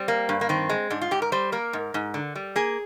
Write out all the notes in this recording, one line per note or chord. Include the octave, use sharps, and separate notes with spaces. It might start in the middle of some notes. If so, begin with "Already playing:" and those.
Already playing: G3 C4
A#3
G2
A#3
D#3 C4
G#3
G#2 D4
F4
G#2 G4
A#4
G3 C5
A#3 A#4
G#2
G#2
D3
G3
A#3 G#4